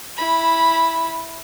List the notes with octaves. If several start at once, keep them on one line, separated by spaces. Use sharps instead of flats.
E4 B5